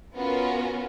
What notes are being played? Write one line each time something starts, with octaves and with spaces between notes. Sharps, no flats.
B3 C#4 F4 F#4 A#4